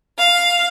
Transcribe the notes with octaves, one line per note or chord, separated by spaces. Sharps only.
F5